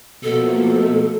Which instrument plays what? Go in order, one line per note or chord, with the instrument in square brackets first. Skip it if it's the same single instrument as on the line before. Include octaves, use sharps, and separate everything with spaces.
[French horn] B2 [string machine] F3 A3 A#3 [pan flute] A4